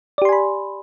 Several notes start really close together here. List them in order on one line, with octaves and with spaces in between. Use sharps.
D5 G4 C6 G#5 B5